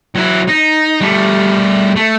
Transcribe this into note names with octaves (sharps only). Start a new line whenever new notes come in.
F#3 E4
D#4
G3 A3
A3